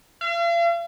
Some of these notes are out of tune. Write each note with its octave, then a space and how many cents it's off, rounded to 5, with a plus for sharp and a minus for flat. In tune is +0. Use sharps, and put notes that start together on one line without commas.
F5 -45